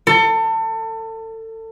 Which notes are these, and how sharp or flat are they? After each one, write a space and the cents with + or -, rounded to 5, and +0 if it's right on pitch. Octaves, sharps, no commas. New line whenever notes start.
A4 +30